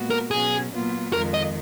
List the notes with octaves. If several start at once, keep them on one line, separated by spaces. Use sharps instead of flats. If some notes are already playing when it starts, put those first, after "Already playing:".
Already playing: A#2 G#3 B3 F#4
A#4
B2 F#3 C#4 G#4
A#2 F#3 B3 F4
F2 D#3 G#3 A#4
D#5